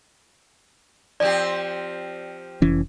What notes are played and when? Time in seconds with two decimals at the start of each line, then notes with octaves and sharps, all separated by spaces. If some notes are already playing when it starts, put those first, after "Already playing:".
1.20 F3 C4 G4 D5
2.62 F1 E3 C#4